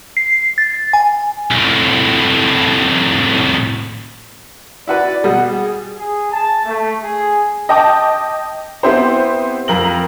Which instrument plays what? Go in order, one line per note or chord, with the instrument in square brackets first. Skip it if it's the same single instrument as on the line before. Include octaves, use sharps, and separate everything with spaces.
[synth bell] C7
A6
G#5
[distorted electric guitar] C2 A2
[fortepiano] E4 F#4 B4 [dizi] D5
[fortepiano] B2 G3 [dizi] F#5
[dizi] G#4
[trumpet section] G#4
A5
A3
G#4
[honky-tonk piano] D#5 G5 A5 D6
B3 C4 E4 G4 C5
F2 A#4 F#7